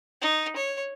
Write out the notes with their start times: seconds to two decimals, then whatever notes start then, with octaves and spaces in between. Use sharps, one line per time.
0.21 D#4
0.56 C#5